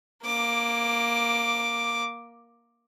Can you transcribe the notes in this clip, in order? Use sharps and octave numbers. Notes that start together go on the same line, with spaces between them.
A#3 D6